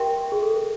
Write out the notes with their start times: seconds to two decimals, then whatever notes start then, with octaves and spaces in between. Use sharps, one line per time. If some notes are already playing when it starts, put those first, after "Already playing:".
Already playing: G4 A#4 B4 E5 G5 C6
0.32 G#4
0.42 A4
0.54 A#4